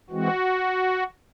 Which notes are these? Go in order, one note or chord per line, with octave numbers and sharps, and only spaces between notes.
E3 G#3 C4 F#4